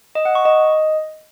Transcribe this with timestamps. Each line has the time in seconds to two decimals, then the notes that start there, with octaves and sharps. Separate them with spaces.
0.15 D#5
0.25 F#5
0.35 C#6
0.45 D#5